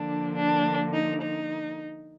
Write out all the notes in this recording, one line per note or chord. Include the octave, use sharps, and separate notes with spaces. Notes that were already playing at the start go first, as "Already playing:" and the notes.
Already playing: D3 F3 A#3 D4
D4
D#4
D#4